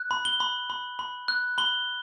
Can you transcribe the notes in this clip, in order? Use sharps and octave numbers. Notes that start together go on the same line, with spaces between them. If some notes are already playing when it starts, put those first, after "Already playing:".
Already playing: F#6
B5
G7
B5
B5
B5
F#6
B5 G7